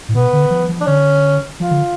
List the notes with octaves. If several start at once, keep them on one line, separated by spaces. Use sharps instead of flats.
A2
B2 B3
D3
F3
F3
D4
D3 C#4
F3 F4
D3